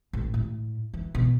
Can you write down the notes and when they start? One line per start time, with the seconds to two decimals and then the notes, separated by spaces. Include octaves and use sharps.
0.13 A1
0.34 A2
0.94 E3
1.15 B2